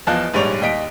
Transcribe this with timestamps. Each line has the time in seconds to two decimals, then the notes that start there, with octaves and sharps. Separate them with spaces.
0.07 E2 F3 D#5 F5 A5 F#6
0.34 A#1 G#2 G3 C#5 D5 F7
0.61 D#2 D#5 B6 D7